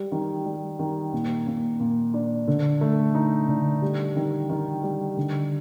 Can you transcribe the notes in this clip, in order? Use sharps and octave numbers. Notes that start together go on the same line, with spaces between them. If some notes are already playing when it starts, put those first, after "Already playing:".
Already playing: G3
D#3
G3
D#3
A#2
A#2
A#2
D4
D3
A3
D#4
D3
G3
D#3
D#3
G3
D3